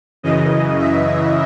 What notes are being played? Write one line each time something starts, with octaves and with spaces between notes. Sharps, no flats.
F#2 C#3 E3 D#5
E5